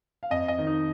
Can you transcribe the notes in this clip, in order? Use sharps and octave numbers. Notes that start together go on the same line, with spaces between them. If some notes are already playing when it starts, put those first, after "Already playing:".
F5
F2 D#5
D#5
D#3
D#4